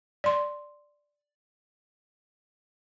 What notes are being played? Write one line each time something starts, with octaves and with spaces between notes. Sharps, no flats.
D5 C6